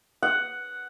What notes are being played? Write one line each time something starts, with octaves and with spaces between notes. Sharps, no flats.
F#5